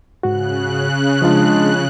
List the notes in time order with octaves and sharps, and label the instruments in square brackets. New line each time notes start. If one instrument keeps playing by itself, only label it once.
[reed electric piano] G#2 F#4 [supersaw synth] C#3 F#6
[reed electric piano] F3 F4 [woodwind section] G#3 D4